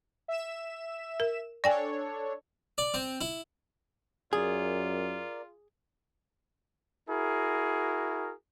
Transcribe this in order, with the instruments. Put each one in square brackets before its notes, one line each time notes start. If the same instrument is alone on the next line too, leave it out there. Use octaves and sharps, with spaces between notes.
[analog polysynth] E5 E7
[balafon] A#4
[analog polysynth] D4 A4 C#5 [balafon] D5 G5 G#5
[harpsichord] D5
C4
E4
[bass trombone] F#2 [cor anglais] F4 [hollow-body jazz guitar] G#4 [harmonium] A#4 D5
[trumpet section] E4 F#4 G#4 A#4